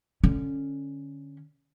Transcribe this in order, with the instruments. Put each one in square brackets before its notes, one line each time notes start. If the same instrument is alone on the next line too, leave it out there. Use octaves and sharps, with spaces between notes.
[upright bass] D3 C#4